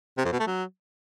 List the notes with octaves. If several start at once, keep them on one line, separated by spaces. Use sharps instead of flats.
C3
F2
B2
A3
F#3